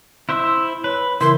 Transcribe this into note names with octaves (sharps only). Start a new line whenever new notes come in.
E4 C5 E5 F#6
B4 C#5
C#3 E3 E4 A#4 C6